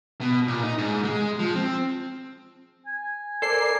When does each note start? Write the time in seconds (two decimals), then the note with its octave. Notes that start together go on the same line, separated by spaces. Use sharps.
0.21 B2
0.48 A#2
0.63 D#4
0.78 G#2
1.05 G#3
1.39 F3
1.55 C4
2.86 G#5
3.42 A4 A#4 C5 D5 C7